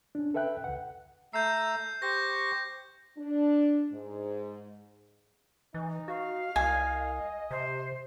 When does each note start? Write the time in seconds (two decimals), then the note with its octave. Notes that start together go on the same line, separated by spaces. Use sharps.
0.15 C#4 D4
0.34 A4 B4 E5 G5 F#6
0.64 C#2 F#5
1.33 A3 A#5 E6 G6 C7
2.02 G4 C5 C#6 G6 A#6
3.18 D4
3.91 G#2
5.74 E3 D#4
6.08 F#4 F5
6.56 C2 D#5 G#5
7.51 C3 C5